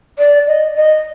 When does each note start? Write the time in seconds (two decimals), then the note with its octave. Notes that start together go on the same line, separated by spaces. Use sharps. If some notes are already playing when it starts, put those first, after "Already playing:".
0.18 D5
0.47 D#5
0.76 D#5